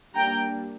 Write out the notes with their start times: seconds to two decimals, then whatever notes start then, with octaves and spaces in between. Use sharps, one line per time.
0.14 G3 A#3 D4 G5 A#5